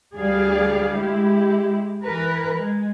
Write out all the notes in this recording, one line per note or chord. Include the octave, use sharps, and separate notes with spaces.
D2 G3 G#4 D5 F5
G#3 E4 G4
E3 A#4 B4
G#3